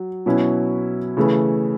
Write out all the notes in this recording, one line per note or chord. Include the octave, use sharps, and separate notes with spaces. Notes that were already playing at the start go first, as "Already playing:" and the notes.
Already playing: F#3
B2 F#3 C#4 E4
C#3 E3 A3 E4